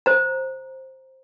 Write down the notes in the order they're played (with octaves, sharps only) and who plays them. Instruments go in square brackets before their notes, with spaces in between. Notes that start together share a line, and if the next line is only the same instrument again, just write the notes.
[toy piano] C5 A#5